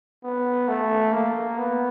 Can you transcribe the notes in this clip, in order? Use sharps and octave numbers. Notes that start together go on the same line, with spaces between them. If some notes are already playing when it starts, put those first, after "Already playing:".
B3
A3
A#3
B3